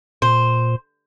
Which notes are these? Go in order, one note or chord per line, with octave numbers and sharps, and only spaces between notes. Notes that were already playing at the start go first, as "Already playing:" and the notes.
A#2 C5